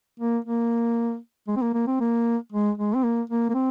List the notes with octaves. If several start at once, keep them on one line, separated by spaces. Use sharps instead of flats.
A#3
A#3
G#3
C4
A#3
A#3
C4
A#3
G#3
G#3
C4
A#3
A#3
A#3
C4